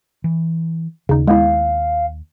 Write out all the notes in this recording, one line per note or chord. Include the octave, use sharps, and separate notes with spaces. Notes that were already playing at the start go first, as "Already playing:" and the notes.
E3
D#2 C#3 D#4
G#3 B3 E4 F5